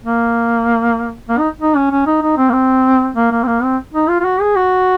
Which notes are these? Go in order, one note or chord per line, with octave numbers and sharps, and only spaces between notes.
A#3
A#3
D#4
D#4
C#4
C#4
D#4
D#4
C4
A#3
C4
A#3
A#3
C4
A#3
C4
D#4
F4
F4
F#4
G#4
F#4